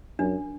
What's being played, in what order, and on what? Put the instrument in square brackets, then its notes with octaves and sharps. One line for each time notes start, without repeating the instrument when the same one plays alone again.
[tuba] F#2 [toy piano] D4